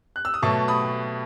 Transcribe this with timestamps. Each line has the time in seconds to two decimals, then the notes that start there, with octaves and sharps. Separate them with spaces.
0.16 F#6
0.25 E6
0.34 D#6
0.42 B2 F#3 A3 A5 C#6
0.68 B5 D#6